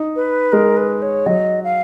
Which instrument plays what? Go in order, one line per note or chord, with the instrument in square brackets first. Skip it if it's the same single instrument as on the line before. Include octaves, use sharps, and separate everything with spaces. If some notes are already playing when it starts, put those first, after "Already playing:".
Already playing: [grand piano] D#4
[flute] B4
[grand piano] G#3 [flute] A#4
[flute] B4
C#5
[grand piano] F#3 [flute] D#5
[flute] F5